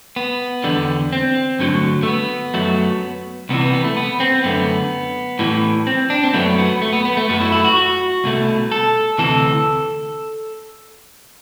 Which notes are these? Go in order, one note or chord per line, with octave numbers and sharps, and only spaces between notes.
B3
E2 D3 G3
C4
G2 D3 F#3 A3
A3
B3
F#2 F#3 A3
C2 C3 E3 B3
B3
B3
A3
B3
C4
F#2 D3 A3 B3
A2 E3 G3
C4
D4
C4
F#2 F#3 A3 B3
B3
A3
B3
B3
A3
F#2 F#3 A3 B3
E4
E4
F#4
F#4
C2 B2 A3
A4
D2 C3 E3 A4